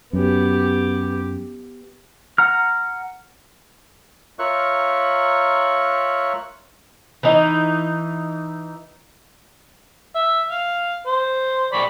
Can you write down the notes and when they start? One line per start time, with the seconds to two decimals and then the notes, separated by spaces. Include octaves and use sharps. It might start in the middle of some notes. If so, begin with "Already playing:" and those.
0.13 F#2 B3 G4
2.38 F#5 A#5 F6
4.39 F4 A#4 C#5 E5 C#6 F#6
7.23 E3 D#4
10.16 E5
10.52 F5
11.07 C5
11.73 D5 B5 C#6